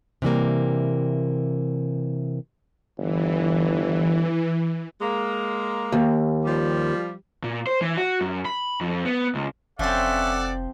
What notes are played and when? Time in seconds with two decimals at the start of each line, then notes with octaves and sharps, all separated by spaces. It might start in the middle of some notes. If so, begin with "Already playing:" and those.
0.22 C3 E3 G3 A#3
2.98 G1 E3
5.01 G#3 A#3
5.92 D#2
6.45 F3 G3
7.44 A#2
7.67 C5
7.82 E3
7.97 F#4
8.21 F#2
8.45 B5
8.81 F2
9.05 B3
9.35 C#2
9.79 F1 F3 C4 C#4 A4 D5 E5 F#5